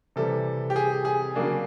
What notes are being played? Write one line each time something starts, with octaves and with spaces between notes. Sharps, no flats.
C3 E3 G3 A4
G4
G#4
G#4
C#3 F#3 A#3 D4